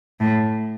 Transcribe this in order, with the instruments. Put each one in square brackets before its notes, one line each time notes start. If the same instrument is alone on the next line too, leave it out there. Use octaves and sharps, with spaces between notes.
[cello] A2